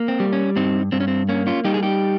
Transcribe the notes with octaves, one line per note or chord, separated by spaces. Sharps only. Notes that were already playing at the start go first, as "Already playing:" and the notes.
Already playing: A#3
C4
G3
C#4
G2 C4 D#4
G2 C4
C#4
C4
A#3 C#4
C#4 F4
G3 D#4 G4
G#4
D#4 G4